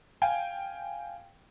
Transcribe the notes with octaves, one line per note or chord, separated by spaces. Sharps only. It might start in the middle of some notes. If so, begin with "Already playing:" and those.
F5 G5 G#5